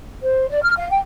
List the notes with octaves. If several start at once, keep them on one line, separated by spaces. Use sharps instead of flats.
C5
D5
F6
F5
G5